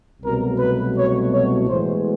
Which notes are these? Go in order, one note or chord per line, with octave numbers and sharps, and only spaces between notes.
C2 B2 F#3 A3 A#4
B4
C#5
C#5
A2 E3 G#3 B3 C5